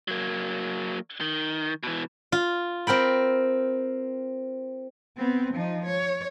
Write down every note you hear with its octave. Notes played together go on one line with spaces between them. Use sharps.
F#3 A#3
D#3
B2 E3
F4
C4 A#4 G5 B5
B3 C4
F3 D#4
C#5